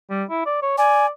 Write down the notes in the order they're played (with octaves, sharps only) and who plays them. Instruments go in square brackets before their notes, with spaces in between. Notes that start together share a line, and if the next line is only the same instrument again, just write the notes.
[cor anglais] G3
E4
D5
C#5
[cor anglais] D5 [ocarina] G#5